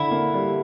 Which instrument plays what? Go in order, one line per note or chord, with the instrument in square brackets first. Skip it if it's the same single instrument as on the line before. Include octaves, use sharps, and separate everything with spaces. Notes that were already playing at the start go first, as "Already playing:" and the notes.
Already playing: [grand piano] D3 [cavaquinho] E4
[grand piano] A#3
G3